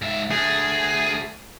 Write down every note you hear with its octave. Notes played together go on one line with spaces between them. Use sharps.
G#2 E5
D2 A3 G#4